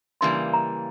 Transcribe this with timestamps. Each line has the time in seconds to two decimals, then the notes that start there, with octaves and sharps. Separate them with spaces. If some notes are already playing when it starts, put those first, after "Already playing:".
0.21 C#3 E3 G3 A#3 C6
0.54 A#5